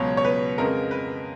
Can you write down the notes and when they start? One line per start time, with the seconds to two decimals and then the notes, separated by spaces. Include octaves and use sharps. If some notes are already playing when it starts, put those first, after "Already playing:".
Already playing: C#2 B2 F#3 C#5
0.17 C#5
0.25 B4
0.58 F2 C#3 G#3 B3 A#4
0.91 B4